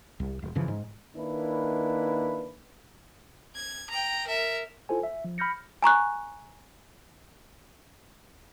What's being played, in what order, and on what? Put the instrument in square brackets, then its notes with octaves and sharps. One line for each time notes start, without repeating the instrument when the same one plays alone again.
[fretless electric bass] C2
E1
F#2 C#3 E3 F3
G#2
[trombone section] D#3 A#3 D4 E4 B4
[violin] G#6
G5 A#5
A#4 E5
[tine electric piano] E4 F4 A4 C5 G#5
E5
F3
B5 F6 G6 A#6 C#7
[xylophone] G#5 A#5 C#6 F#6